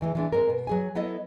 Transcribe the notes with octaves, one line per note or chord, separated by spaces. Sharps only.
E2 E3 F#3 G#3
E3 G3 G#3 B3 D4
G#2 G#3 C4 A#4
B2
F#3 G#4 G#5
F#3 B3 E4 A4 D#5